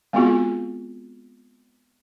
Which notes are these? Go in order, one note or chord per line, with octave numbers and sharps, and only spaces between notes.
G#3 B3 C4 F4 F#4 G#4